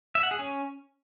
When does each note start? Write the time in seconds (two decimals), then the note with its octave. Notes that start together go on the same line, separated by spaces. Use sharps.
0.15 E5
0.23 F#5
0.31 G#4
0.39 C#4